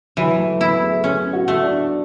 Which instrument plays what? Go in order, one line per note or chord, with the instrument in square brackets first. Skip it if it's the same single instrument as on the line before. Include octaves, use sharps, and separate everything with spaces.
[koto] E3 [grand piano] F#3
[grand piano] A3
[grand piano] B3 [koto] E4
[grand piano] G#4
A4
[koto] C#4 [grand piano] G#4
[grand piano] F#4
[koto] A3
[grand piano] D4